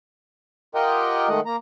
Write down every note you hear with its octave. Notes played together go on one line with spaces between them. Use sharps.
F4 G4 A#4 D#5 F#5 G5
D#3 G#3 A3 D#5 F#5
A#3 A#5